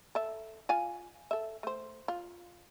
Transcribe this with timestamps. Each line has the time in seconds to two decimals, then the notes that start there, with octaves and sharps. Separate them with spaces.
0.15 A4 E5
0.69 F4 F5 G#5
1.31 A4 E5
1.63 A3 C5
2.08 F4